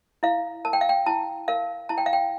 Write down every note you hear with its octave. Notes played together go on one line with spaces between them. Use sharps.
E4 F5
A#4 A5
G5
F5
G5
E4 A5
A#4 F5
E4 A5
G5
F5
G5